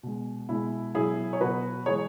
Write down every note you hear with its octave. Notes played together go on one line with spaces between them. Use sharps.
B2 G#3
B2 G#3 E4
B2 F#3 E4 G#4
C#5
B2 F#3 F#4 B4
E3 G#3 G#4 C#5